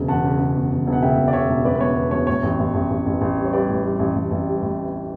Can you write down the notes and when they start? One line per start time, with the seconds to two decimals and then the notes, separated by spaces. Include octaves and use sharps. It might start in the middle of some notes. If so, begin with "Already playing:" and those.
Already playing: E1 C#3
0.08 E2 F#5 A5
0.24 C#3
0.39 C#3
0.55 E2
0.71 E2
0.87 E1
0.92 F#5
1.02 C#3 E5 G5
1.17 E1
1.28 D5
1.33 C#3 C#5 E5
1.49 E1
1.65 E1 B4 D5
1.75 B4
1.81 E1 C#5
1.96 E1 B4
2.11 E1 C#5
2.27 A2 C#5
2.43 A1
2.59 A1
2.74 A1
2.90 A1
3.06 A1
3.21 A1
3.37 G3
3.45 C#5
3.53 G3 B4 D5
3.69 A2
3.84 G3
3.99 A1
4.15 A1
4.31 A1
4.47 G3
4.62 A2